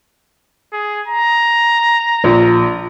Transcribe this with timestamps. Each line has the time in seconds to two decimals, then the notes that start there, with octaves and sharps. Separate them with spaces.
0.73 G#4
1.07 A#5
2.24 A#1